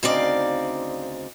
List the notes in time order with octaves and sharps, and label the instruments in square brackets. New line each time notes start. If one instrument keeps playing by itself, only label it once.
[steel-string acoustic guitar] D2 C#3 C4 D#4 D5 F5